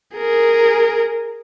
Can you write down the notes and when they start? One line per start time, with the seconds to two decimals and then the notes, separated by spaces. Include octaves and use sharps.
0.17 G#4 A#4